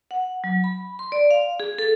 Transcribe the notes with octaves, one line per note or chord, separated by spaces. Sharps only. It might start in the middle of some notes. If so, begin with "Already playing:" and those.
F#5
F#3
B5
C6
D5
F5
G#4
A4